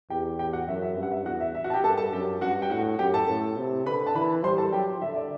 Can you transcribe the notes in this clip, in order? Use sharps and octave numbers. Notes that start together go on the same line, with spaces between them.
E2 G4 G5
G4 G5
F#4 F#5
F#2 E5
E5
G2
F#5
E5
E2 F#4 F#5
E5
E5
F#4 F#5
A5
G4 G5
G2 A4 A5
A4 A5
F#2 G4 G5
G2 F#4 F#5
G5
A2 F#4 F#5
F#2 G4 G5
A4 A5
A2
C3
D3 B4 B5
A5
E3 B4 B5
G3 C5 C6
A4 A5
F#3 G4 G5
D3 E5
E5
D5